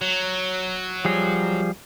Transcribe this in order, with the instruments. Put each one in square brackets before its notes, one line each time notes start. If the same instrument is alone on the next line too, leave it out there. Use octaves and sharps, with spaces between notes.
[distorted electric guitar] F#3
[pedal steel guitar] F3 G3 G#4